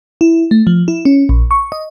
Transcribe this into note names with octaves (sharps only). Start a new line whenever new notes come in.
E4
A3
F3
E4
C#4
A#1
C#6
D#5